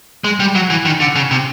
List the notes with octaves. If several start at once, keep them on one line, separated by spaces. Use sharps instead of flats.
G#3
G3
F#3
E3
D#3
D3
C#3
C3